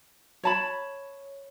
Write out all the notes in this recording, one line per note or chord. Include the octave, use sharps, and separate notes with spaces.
C#5 A5 B5